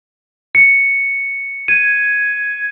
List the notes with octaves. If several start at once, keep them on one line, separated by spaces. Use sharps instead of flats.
C#7
G#6 D#7